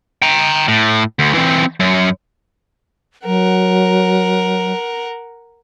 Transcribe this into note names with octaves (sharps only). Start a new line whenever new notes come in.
G5 A#5
A2
D2
E3 C4
F#2
F#3 A#4 F#5